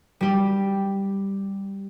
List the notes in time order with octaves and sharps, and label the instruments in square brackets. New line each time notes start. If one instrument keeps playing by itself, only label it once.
[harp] G3 G4